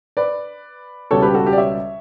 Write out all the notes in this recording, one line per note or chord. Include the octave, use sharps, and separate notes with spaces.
B4 D5
C#2 B2 G3 A4 C#5
G4 B4
F#4 A4
G4
D5
C#5 E5